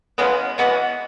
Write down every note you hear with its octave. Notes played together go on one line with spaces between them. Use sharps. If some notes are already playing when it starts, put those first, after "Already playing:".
C#3 E3 G#3 B3
E3 G#3 B3 F#4